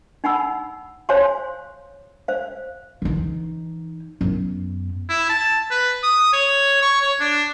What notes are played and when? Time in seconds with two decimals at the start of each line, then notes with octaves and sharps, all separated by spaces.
0.24 D#4 F#5 G#5 B5 E6
1.09 C5 C#5 F5 G#5 C6
2.28 C5 F5
3.02 E3 D#4
4.21 F#2 B3
5.10 E4
5.29 A5
5.71 B4
6.03 D#6
6.33 C#5
6.82 C#6
7.02 C#5
7.20 D4